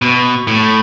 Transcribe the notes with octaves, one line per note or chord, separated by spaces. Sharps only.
B2
A2